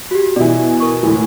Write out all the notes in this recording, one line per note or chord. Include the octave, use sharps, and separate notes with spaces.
F#4 G4
B2 E3 D5 E5
A#4 C#6
D2 A2 E3